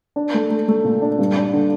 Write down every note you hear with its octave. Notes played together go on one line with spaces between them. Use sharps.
D4
A3
A3
A3
A#2
D4
G2
D4
D3